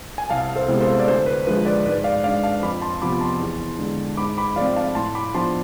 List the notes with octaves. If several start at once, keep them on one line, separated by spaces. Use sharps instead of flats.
G#5
C2 F5 A5
A4 C5
C3 G#3 B3 E4
A4 C5
D5
D2 A4 C5
B4
D3 F3 G#3 B4
B4 D5
G#2 B4 D5
D5 F5
G#3 D4 D5 F5
F5 A5
F2 B5 D6
A5 C6
C3 F3 B3 B5 D6
A5 C6
E2
D3 G#3
G#2 B5 D6
B5 D6
F3 A3 C4 D5 F5
F5 A5
A2 A5 C6
B5 D6
F3 B3 D4 A5 C6